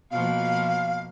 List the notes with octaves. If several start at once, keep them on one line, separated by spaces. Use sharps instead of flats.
B2 F3 A#3 F5